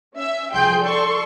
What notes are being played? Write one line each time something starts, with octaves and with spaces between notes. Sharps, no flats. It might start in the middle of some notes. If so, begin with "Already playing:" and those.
C#4 E5
C2 F3 G#4 G5 C6 G6
A4 D5 C6 C#6